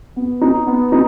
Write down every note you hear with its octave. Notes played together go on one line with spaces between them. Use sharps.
B3
D#4
B3
D#4